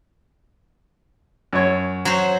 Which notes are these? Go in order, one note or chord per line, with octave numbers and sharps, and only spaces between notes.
F#2 C#5
F#3 F#4 C5